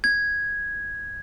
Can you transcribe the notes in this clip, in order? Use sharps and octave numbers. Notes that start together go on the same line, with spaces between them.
G#6